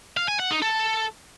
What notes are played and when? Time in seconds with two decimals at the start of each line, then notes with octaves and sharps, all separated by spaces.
0.17 F5
0.28 G#5
0.40 F#5
0.51 D#4
0.62 A4